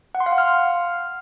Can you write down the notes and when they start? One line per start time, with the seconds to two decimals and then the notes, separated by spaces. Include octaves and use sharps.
0.15 F#5
0.20 C6
0.26 F5
0.32 F#5
0.38 F6